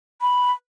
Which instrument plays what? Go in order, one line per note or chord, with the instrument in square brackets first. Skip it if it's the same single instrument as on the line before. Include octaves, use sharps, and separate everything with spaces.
[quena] B5